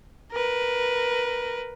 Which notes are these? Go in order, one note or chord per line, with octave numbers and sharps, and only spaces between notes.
A#4 B4